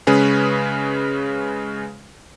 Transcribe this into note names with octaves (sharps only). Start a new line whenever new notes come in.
C#3 G#3 C#4 G#4 B4